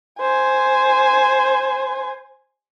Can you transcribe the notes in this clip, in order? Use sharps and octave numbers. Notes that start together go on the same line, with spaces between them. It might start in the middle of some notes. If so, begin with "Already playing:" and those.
C5 G#5